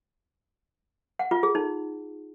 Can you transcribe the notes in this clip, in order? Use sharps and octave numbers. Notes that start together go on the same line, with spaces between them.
F#5
F4
G#4
D#4